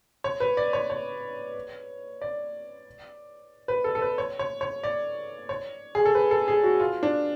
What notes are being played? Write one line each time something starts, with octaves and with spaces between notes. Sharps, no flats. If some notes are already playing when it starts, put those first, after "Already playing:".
C#5
B4
D5
C#5
C#5
D5
B4
A4
A4
B4
C#5
C#5
C#5
D5
C#5
G#4
A4
B4
A4
G#4
F#4
F4
D4